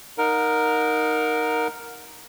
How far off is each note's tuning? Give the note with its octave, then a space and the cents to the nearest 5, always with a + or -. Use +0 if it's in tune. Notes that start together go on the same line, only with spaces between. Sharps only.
D#4 +0 A#4 +0 F#5 -35